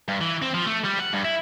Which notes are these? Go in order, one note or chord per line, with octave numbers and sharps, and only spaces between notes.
G2
E3
C4
F3
A3
G3
F#5
G2
E4